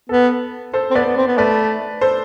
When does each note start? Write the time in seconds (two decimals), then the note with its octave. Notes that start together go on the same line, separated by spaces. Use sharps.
0.09 B3 A4
0.74 A4 C5
0.90 C4
0.95 B3 B4 D5
1.06 B3
1.17 C4
1.27 B3
1.38 A3 B4 D5
2.01 A4 C5